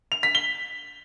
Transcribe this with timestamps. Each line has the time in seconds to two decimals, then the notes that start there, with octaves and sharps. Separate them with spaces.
0.12 F7
0.23 B6
0.35 G7